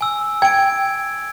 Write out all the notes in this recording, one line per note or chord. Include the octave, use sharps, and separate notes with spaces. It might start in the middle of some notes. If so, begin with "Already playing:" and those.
G#5 E6
G5 G#6 D7